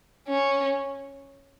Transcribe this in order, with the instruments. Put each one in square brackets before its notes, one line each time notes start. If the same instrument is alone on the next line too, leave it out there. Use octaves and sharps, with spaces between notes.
[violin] C#4